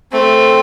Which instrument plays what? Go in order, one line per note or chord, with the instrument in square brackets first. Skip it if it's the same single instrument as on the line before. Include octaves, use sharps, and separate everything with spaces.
[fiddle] A3 [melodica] C4